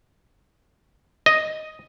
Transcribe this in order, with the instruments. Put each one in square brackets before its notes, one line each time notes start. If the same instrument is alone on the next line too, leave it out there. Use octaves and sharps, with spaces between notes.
[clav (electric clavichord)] D#5